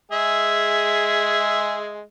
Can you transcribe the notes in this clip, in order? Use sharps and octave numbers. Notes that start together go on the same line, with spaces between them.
G#3 G#4 E5